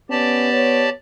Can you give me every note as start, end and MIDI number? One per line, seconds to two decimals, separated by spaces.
0.10 0.91 59
0.10 0.48 61
0.10 0.89 67
0.10 0.89 74
0.10 0.89 81
0.53 0.92 73